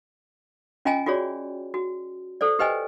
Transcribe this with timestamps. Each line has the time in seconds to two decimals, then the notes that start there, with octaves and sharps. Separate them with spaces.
0.85 C#4 F4 D#5 G5 G#5 A#5
1.06 F4 F#4 G#4 C#5 D5
1.74 F#4
2.41 A4 C5 D5
2.59 G4 B4 C5 D#5 G5 G#5